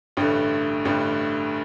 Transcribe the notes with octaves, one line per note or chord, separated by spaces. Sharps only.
A1 G2 D3 A3
A1 G2 D3 A3